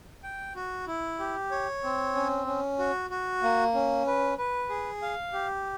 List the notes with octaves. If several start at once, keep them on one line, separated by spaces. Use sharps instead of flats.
G5
F#4
E4
G4
C#5
C4
C#4
C#4
F#4
F#4
A#3
C#4
B4
B4
G#4
F5
G4